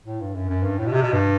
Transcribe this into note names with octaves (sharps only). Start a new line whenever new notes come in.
A2
G2
F#2
F#2
G2
A2
B2
C3
B2
G2